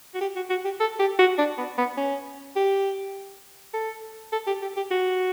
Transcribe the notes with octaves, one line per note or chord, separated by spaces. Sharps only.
F#4
G4
F#4
F#4
G4
A4
G4
F#4
D4
B3
B3
C#4
G4
A4
A4
G4
G4
G4
F#4